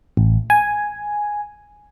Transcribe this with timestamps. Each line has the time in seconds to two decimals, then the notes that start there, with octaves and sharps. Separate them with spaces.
0.17 A1
0.50 G#5